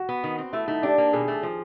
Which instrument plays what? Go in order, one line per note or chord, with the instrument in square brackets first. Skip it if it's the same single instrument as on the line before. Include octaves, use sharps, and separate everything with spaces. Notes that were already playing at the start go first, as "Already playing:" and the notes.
Already playing: [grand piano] F#4
[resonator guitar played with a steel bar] B3
D#3
C4
[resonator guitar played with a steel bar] A3 [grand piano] E4
[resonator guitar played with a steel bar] A3 [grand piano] D#4
[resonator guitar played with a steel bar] D4 [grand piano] G4
[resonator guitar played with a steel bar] A#3
[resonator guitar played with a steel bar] B2 [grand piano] G#4
[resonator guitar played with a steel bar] A3
F3